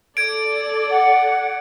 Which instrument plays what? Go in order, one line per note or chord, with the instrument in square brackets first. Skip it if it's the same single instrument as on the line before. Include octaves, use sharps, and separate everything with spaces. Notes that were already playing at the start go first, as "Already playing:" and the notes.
[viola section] A4 D5 [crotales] G#6 D7
[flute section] F#5